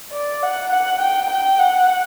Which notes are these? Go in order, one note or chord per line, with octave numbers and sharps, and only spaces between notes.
D5
F#5
F#5
G5
G5
F#5